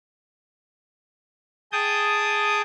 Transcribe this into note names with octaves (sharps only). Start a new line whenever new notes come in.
G#4 G5 A5 D#6 G6